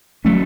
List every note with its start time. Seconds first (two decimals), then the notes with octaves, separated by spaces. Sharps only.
0.25 F#3 A3 C#4